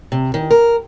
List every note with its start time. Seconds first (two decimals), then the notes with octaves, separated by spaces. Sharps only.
0.12 C3
0.34 D#3
0.51 A#4